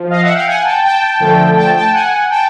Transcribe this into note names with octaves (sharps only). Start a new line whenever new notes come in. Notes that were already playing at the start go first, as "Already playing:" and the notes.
Already playing: F3
D#5 F5
E5 F#5
F5 G5
F#5 G#5
G5 A5
G5 A5
D3 F3 A3
G5 A5
G5 A5
F#5 G#5
G5 A5